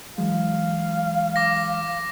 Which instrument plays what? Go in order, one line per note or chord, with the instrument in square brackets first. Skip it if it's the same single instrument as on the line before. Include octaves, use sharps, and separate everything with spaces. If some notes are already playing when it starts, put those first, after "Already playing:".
[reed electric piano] E3 F#3 G#3 [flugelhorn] F5
[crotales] D6 A#6